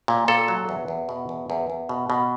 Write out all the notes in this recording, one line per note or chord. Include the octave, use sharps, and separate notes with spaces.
A#2
A#2 A4
F#3
E2
E2
B2
E2
E2
E2
B2
B2